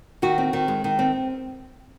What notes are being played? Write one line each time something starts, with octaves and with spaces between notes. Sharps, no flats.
D#3 F#4
C4
D#3
G#3
D#3
C4